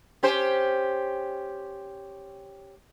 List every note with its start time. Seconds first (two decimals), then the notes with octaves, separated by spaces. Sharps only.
0.23 C#4 G4 C5